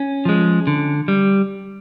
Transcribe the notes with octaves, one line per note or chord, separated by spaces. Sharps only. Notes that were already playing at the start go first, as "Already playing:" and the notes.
Already playing: C#4
F3 G#3
D3
G3